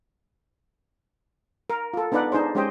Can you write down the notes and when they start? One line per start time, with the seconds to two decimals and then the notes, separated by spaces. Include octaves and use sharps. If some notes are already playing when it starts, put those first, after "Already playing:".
1.70 A#4
1.94 F4 A4
2.12 B3 D4 D#4 B4 D5 F#5
2.32 D4 D#4 G#4 C5
2.55 G#3 C#4 G4 C5 D#5 G5